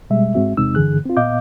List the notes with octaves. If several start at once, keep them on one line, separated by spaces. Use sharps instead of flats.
B2 G3 G#3 E5
G#2 G#3 C4 F#4 E5
E2 C3 G#3 C4 D#4 E6
G2 D3 E3 G#4 F#6
C4 F4
A#2 B3 D#5 F5 D6 G6